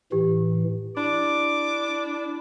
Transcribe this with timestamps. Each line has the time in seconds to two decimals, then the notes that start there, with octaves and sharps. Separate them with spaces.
0.12 A2 E3 G4
0.97 D4 E4 D6